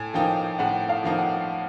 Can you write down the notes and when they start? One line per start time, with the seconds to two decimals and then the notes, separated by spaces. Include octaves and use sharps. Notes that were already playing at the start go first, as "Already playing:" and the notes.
Already playing: A2 G#5
0.14 F3 A#3 D#4 G5
0.59 A2 F#5
0.89 F5
1.04 F3 A#3 D#4
1.18 F#5